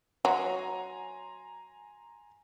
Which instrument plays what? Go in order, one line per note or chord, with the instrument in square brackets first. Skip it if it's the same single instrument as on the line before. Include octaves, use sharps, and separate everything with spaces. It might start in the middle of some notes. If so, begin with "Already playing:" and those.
[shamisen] F#3 [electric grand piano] G#5 A#5 C6